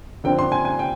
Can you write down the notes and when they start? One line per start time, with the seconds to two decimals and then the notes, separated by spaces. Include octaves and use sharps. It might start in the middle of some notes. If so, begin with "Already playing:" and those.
0.24 D3 F3 C4 G5
0.39 C6
0.52 G#5
0.65 G#5
0.79 G5